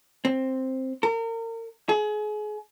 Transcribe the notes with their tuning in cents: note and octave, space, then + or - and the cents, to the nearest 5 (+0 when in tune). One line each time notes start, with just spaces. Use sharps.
C4 +5
A#4 -35
G#4 +30